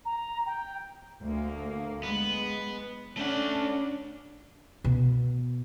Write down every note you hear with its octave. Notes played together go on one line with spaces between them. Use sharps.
A#5
G5
D2 A#3
G#3 B3
A3 C#4 D4 F#5
B2 B3